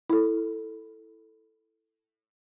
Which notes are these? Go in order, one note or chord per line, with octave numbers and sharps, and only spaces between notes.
E4 A4